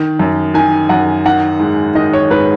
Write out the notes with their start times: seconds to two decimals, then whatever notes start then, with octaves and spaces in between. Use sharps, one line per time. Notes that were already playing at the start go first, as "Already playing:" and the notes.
Already playing: D#3
0.19 F#2
0.54 D#3 G#5
0.89 F#2 F#5
1.25 D#3 F#5
1.60 G#2
1.95 D#3 D#5
2.13 C#5
2.30 G#2 B4